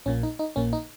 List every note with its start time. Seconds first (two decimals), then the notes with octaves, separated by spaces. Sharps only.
0.06 A#1 A#2 A#3 C#4
0.23 D#4
0.39 D#4
0.56 A#1 A#2 A#3 C#4
0.73 D#4